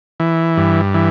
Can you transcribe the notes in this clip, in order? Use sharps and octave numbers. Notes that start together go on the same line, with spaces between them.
E3
G2
E3